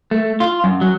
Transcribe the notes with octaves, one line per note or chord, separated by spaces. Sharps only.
A3
F4
F#2
F#3